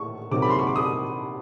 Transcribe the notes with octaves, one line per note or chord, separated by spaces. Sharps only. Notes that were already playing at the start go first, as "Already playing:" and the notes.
Already playing: A2 C#6
C3 D#3 F#3 D6
B5
C6
C#6
D6
D#6